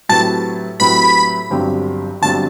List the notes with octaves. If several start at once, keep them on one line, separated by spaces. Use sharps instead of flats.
A2 F#3 C4 G4 B4 A5
A2 F#3 C4 G4 B4 B5
G1 G2 F#3 C4 G4
G1 G2 F#3 C4 G4 A5